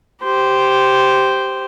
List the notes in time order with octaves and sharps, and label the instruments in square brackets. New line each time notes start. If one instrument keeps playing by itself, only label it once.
[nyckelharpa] G4 C5